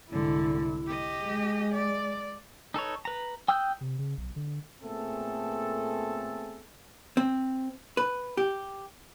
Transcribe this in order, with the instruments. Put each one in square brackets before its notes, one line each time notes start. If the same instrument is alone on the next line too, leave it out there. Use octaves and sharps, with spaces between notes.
[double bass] C2 E4 [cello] G#2 D3
[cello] G4 D#5
[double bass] G#3
[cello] D5
[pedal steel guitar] D#4 A4 B4 C#5
B4 A#5
G5 D#6 E6 F#6 G6
[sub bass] C3
C#3
B1
D3
[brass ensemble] A#2 A3 B3 C4 G#4 A4
[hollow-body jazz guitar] C4
B4
G4